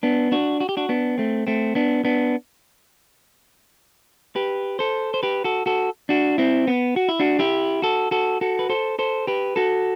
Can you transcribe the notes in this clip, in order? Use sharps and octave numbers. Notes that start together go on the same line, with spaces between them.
B3 D4
D4 F#4
F#4
G4
D4 F#4
B3 D4
A3 C4
A3 C4
B3 D4
B3 D4
G4 B4
A4 C5
C5
G4 B4
F#4 A4
F#4 A4
D4 F#4
C4 E4
B3
F#4
E4
D4 F#4
E4 G4
F#4 A4
F#4 A4
F#4 A4
B4
A4 C5
A4 C5
G4 B4
F#4 A4